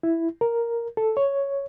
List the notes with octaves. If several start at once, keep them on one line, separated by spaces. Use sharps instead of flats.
E4
A#4
A4
C#5